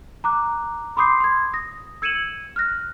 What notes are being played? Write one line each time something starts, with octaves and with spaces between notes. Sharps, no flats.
A#5 D6 F#6
B5 C6 D6 D#6 G6 C7
C6 G#6
D#6 A#6
E6 G#6 C#7 D#7 E7 F#7
F6 F#6 A#6